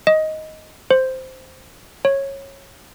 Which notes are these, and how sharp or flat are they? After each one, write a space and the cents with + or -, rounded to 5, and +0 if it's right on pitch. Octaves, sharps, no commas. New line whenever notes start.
D#5 +10
C5 -5
C#5 -15